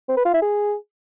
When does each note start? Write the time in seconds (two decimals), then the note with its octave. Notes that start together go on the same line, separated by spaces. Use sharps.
0.09 C4
0.17 B4
0.25 F4
0.34 E4
0.42 G#4